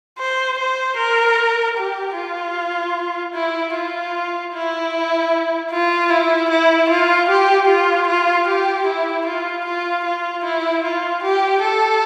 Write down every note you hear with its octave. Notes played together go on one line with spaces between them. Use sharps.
C5
C5
A#4
G4
F4
E4
F4
E4
F4
E4
E4
F4
G4
F4
F4
G4
E4
F4
F4
F4
E4
F4
G4
A4